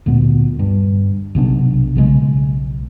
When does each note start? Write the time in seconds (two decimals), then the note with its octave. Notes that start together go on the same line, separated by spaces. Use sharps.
0.06 D2 A#2 G#3 B3
0.59 G2
1.35 B1 C3 B3 D4
1.95 B1 C#3 E3 G#3